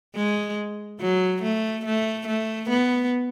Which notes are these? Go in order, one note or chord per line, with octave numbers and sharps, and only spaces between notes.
G#3
F#3
A3
A3
A3
B3